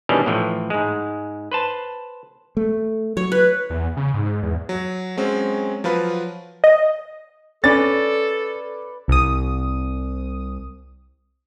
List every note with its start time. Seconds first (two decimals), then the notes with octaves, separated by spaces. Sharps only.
0.09 B2 D#3 E3 G3 C#4 D4
0.26 A2 E3 F3
0.70 G#2 G#3
1.52 B4 C5 A5
2.57 A3
3.17 F#3 C#5
3.32 B4
3.70 E2
3.97 C#3
4.14 G#2
4.43 E2
4.69 F#3
5.17 F#3 G#3 C4 C#4
5.84 F3 F#3 F4 B4
6.64 D#5
7.64 C#4 A4 B4 D5 A6
9.08 C2 D#6